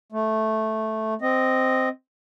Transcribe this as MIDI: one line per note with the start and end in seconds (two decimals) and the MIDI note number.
0.12 1.14 57
1.22 1.89 60
1.22 1.89 75